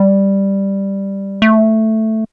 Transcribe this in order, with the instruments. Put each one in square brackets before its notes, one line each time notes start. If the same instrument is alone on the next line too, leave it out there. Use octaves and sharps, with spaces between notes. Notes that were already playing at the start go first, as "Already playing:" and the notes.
Already playing: [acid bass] G3
A3